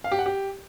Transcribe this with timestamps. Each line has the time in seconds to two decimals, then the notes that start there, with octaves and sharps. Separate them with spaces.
0.04 F5
0.12 G4
0.19 F#5
0.26 G4